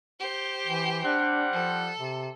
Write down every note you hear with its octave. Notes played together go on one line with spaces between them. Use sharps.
G4 C5
E3
G3 C4 D4 F#5
F3 A4
C3